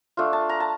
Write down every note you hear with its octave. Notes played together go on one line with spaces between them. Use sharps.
A3 D4 F4
A5
A#5
A5